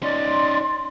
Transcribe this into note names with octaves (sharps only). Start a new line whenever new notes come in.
C#4 D#4 D5 C6